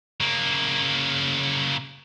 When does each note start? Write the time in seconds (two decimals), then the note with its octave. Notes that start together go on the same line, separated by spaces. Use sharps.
0.21 C#3 A#3